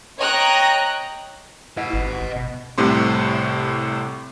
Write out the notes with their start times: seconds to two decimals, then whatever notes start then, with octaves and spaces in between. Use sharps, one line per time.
0.18 C#5 D#5 G5 A#5 F#6
1.77 E4 D#5 F#5
1.93 G#1
2.36 B2
2.78 C2 A2 C3 C6